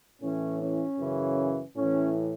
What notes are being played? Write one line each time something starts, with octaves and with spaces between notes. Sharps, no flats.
A2 E3 C#4
C#4
F#2 C#3 E3
A2 E3 C#4